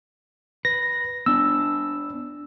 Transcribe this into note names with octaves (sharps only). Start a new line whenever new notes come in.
B4 A#6
B3 D4 E6